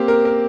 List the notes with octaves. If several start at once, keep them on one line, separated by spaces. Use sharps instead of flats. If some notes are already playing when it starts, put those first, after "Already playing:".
Already playing: A#3 C4 G4
A#4
A#4